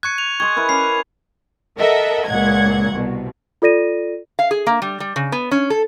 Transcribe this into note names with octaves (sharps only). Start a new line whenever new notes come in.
C#6 F#6 G#6 C#7
F7
G#4 D#5 C6 C#6 G#6
E4 A#4 B4
C#4 B5 D6 C7
A4 A#4 D#5 E5 F#5
C#2 A#2 F#5 G#6
C2 B2
F4 A4 D5 A#6 D#7
F5
G#4
A#3
G3
G3
C#3
B3
C#4
A4